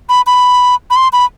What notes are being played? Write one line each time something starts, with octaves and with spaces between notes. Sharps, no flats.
B5
B5
B5
C6
B5